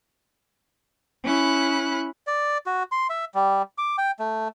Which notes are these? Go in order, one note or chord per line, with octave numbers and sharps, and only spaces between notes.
C#4 E4 B5 F#6
D5
F#4
C6
E5
G3
D6
G5
A3